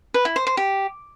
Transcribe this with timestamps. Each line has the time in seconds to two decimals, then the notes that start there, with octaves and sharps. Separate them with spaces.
0.14 B4
0.25 E4
0.36 C5
0.47 C5
0.57 G4